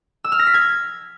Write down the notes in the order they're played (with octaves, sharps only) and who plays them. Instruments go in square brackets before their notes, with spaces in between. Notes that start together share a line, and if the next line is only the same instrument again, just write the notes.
[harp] E6
F6
A#6
B6
G#6